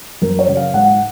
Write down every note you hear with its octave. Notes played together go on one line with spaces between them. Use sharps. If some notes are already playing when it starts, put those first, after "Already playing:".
F#2 A#4
C#5
C#3 F#3
F5
G#2 F#5